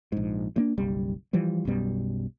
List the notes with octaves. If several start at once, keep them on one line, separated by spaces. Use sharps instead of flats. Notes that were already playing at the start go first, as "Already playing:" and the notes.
A#1 G#2
G2 A#3 D4
F#1 B1 G3
E3 F3 G3
B1 F#2 B2 G3